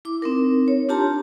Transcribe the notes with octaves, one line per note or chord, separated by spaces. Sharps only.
E4 D6
C4 D#4 A#4
C#5
D4 F4 G4 A5 A#5 C6